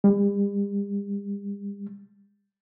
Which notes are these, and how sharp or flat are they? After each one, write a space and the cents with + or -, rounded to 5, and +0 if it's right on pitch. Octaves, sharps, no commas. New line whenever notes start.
G3 +40